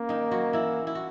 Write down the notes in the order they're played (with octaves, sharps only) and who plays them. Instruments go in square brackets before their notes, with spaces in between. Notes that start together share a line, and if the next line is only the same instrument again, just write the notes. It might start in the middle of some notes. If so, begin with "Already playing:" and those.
Already playing: [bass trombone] A#3 [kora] C#4
[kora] D#3 D#4
F#3 F#4
E3 E4
E4
F#4